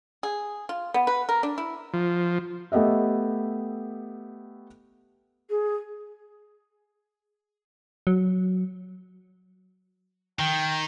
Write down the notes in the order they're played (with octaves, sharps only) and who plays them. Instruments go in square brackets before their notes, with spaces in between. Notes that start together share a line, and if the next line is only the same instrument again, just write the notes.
[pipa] G#4
F4
B3
B4
A#4
D4
E4
[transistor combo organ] F3
[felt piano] A3 B3 G4 D#5 E5
[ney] G#4
[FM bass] F#3
[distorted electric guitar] D#3 [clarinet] G5